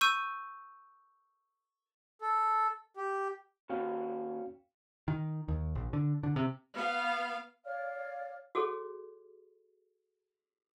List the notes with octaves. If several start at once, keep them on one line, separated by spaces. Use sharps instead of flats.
C#6 E6 G6 D#7
A4
G4
D#2 C#4 F#4 F5 G5
D#3
D#2
A#1
D3
D3
C3
B3 F5
C#5 D5 F5 F6
F#4 G#4 A4 C#5